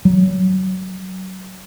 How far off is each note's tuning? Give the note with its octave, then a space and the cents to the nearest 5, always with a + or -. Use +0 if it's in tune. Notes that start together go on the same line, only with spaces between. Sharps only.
F#3 +25